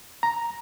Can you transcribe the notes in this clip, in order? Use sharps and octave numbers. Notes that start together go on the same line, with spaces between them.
A#5